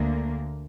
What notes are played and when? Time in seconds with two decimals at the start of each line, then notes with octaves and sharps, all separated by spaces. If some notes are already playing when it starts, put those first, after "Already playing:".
Already playing: D2 D3 A#3